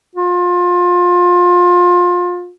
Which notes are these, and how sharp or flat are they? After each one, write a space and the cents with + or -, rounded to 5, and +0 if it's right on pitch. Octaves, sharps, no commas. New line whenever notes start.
F4 +25